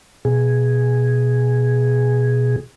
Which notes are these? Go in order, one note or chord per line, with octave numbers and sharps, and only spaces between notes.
B2 G#4